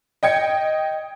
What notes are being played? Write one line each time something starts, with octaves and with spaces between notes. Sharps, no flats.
D#5 G5 G#6 C#7